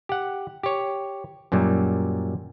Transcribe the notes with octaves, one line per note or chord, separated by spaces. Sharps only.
G4 F#5
G4 C#5
F#2 A#2 F#3 G3